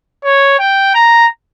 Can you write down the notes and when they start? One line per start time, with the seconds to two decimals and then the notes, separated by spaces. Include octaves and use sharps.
0.24 C#5
0.59 G5
0.95 A#5